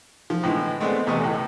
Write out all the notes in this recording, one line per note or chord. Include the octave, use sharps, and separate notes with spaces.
F3
A2 D3 E3 G#3
G#3 A3 B3 C4 D4 G#4
E2 C3 A3 D#5 C#6
C#2 A2